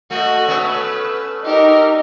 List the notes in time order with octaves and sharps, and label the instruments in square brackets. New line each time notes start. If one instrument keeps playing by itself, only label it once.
[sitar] A3 [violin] F#4 D#5
[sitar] A3 B3 C#4 [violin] B4 [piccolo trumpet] E6
[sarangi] D#4 [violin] G4 A#4